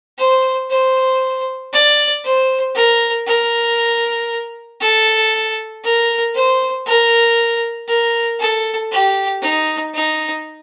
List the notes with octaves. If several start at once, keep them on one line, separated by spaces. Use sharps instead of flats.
C5
C5
D5
C5
A#4
A#4
A4
A#4
C5
A#4
A#4
A4
G4
D#4
D#4